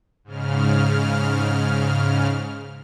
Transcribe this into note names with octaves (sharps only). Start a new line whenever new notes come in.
G#2 C#3 F6